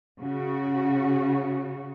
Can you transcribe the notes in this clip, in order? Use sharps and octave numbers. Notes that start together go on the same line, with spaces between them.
C#3 F#4